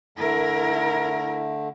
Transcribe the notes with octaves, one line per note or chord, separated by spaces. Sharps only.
D3 A3 E4 A#4